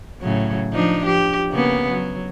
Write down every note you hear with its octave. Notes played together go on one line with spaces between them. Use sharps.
A2 C#3 F#3
F3 D4 D#4
F3 G4
C#3 A#3 B3
F#3